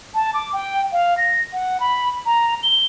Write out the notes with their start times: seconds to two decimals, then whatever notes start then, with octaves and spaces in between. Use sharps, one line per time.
0.14 A5
0.34 D6
0.53 G5
0.93 F5
1.17 A#6
1.53 F#5
1.80 B5
2.26 A#5
2.63 G7